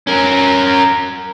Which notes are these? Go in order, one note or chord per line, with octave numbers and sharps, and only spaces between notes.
C#4 A#4